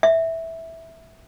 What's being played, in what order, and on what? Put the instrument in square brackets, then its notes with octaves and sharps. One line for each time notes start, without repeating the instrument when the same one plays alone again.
[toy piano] E5